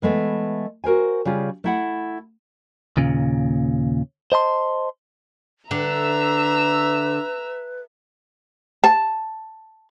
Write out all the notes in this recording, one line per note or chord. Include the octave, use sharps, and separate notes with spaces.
E3 G#3 A3 B3
F#4 A#4 C5 G#5
C#3 G3 F4 G#4
A3 E4 F#5
D#2 A#2 C#3
C5 D#5 A5 C6
D3 B4 E5 A#5 E6
A5